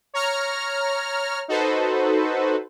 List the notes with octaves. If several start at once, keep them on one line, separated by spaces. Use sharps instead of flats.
C#5 A#5 F6
D#4 F#4 A4 B4 C5